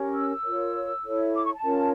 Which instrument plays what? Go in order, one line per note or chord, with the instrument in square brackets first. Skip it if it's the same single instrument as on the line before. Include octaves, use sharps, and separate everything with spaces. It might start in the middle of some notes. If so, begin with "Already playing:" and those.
Already playing: [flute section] C#4 G4 A#4 C#5
E6
F4 A#4 C#5
E4 A4 C#5
D6
C#6
A5
C#4 F4 A#4 C#5